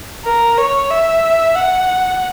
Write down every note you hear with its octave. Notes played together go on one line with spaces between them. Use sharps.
A#4
C#5
E5
F#5